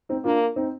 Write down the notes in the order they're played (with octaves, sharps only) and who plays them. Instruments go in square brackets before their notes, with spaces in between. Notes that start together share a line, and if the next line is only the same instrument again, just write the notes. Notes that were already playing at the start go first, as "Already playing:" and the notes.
[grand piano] C4 D#4
[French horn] A#3 [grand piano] D4 F4
[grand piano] C4 D#4